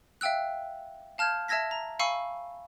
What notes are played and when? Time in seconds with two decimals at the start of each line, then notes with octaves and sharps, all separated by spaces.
0.21 E5 F5 G5 E6 F#6
1.18 F5 A5 F6 G6 G#6
1.48 E5 A5 E6 G#6 A#6 B6
1.71 A#5
1.99 F5 G#5 B5 C#6 E6 C#7